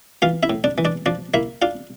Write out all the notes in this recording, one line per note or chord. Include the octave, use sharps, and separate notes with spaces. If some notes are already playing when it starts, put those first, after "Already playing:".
E3 F4 F5
E4 E5
A2
D4 D5
E3
D4 D5
F3 D4 D5
A#3 E4 E5
D4 F4 F5